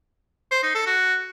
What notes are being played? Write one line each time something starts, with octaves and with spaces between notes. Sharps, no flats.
C5
D#4
A4
F#4